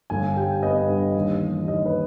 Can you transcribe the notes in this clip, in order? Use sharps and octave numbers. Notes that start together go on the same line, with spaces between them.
G1 G#5
G3 G5
B3 D#5
G2
D#2
E3
D#2 D#5
B4